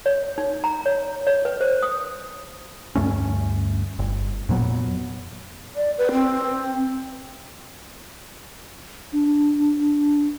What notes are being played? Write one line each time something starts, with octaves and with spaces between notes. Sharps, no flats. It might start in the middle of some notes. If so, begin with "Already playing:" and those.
C#5
D#4
A#5
C#5
C#5
B4
C5
D#6
D2 G2 A3 C#4
G1
F2 A#2 F#3 B3
D5
B4
C4
D4